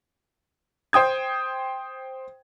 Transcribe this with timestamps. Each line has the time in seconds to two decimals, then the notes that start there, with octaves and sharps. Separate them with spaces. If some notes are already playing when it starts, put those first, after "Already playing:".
0.93 C5 G5 D#6 G#6